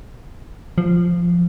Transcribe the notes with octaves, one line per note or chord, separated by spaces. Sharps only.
F3